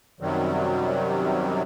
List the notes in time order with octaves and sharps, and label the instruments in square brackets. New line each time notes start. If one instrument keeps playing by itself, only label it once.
[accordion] F#2 C3 D#3 F#3 G3